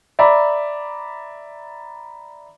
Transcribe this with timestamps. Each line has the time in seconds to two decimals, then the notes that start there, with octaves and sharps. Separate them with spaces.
0.19 D5 E5 A#5 B5